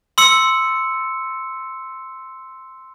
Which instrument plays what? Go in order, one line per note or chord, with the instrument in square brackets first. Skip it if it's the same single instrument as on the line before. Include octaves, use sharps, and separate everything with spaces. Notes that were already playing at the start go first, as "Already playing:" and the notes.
[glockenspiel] C6 E6 C#7